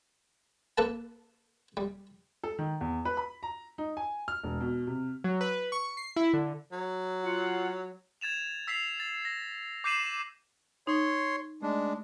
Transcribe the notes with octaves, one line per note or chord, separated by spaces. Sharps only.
A#3 A4 B4 A5
G3
A4
D#3
E2
B4
B5
A#5
D#4
G#5
F6
E1
B2
C3
F#3
B4
C#6
C7
E4
D3
F#3
F4 F#5
G#6 A6 E7 F7
E6 B6 C7 F7
A6
A#6
D6 G6 C7 D#7 E7 F#7
D#4 C#5 C6
G#3 A3 D4